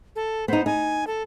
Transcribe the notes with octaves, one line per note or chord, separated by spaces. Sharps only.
A4
B3 D#4 C5
D#4 G#5
A4